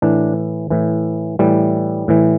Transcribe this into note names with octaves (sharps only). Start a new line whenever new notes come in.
A2 E3 D4
A2 E3
A2 E3 G3
A2 E3